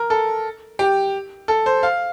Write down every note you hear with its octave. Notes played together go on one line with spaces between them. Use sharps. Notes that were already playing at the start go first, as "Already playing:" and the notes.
Already playing: A#4
A4
G4
A4
C5
F5